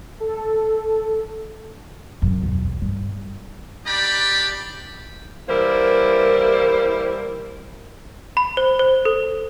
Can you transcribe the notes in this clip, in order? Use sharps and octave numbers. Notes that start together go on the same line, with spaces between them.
A4
F#2 C#3
B1 E2
G2
D4 D#4 G4 D5 B5
E3 G3 A#3 E4 A#4 C5
B5
C5
C5
A4